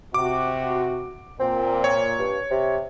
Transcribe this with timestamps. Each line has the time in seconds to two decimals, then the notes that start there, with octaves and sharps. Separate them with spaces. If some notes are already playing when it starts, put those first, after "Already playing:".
0.14 C3 F#4 D6
1.39 A#2 C4
1.84 C#5
2.18 G2
2.50 C3